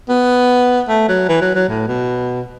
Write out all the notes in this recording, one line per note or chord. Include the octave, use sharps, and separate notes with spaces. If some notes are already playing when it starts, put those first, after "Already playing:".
B3
A3
F#3
E3
F#3
F#3
A2
B2